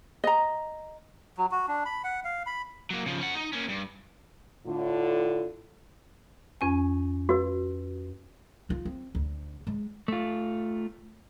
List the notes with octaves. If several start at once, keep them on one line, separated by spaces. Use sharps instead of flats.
D#5 A#5
F#3
F#4
D4
B5
F#5
F5
B5
F#3 A#3
C#3 F3
C#4 F#5
D#4
A#3 C#4
G2
A2 D3 F4
F2 C#4 G#5
F#4 B4
D#4 F4
C4
D2
G#3
A3 F4